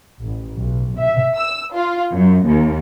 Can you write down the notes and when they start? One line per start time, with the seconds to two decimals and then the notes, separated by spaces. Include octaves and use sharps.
0.21 A1
0.57 B1
0.99 E5
1.35 E6
1.75 F4
2.13 F#2
2.45 D#2